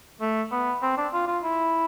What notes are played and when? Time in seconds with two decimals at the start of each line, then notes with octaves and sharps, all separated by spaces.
0.21 A3
0.52 B3
0.82 C4
0.97 D4
1.13 F4
1.28 F4
1.44 E4